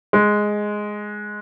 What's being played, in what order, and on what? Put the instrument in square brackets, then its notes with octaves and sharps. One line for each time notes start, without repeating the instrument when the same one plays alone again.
[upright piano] G#3